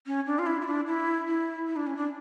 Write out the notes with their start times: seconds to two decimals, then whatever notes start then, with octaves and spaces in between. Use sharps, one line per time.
0.07 C#4
0.26 D4
0.39 F4
0.46 E4
0.61 E4
0.67 D4
0.87 E4
1.27 E4
1.67 E4
1.76 D4
1.87 C#4
1.97 D4